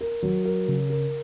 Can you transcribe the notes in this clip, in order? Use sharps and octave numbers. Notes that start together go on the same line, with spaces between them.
A#4
F#3
A#4
C#3
A#4